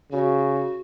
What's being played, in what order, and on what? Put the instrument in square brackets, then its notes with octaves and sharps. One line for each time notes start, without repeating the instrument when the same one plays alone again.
[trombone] C#3 [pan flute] F#4